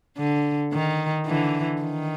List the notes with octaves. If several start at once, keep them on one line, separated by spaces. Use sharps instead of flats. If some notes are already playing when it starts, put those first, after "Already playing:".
D3
D#3
D3 E3
D#3